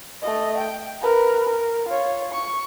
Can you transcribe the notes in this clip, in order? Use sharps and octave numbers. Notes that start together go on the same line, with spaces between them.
A3 D#5
G5
A#4 B4
A#4
F4 C#5
C#6